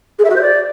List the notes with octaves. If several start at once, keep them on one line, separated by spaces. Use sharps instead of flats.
G#4
E5
F#4
C5
D5